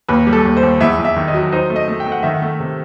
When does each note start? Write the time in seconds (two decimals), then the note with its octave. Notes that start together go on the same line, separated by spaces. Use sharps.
0.08 D#2 B4
0.27 G3
0.33 A4
0.45 D#2
0.57 C5
0.63 D#2
0.81 E2 E5
0.99 E2
1.04 E5
1.16 D#3
1.28 D#5
1.34 F#3
1.52 D#4 C5
1.70 A3
1.76 D#5
1.88 A3
2.00 G5
2.06 A3
2.12 F#5
2.23 D#3 E5
2.34 F#5
2.42 A3
2.60 C3